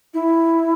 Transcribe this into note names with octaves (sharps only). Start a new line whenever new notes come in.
E4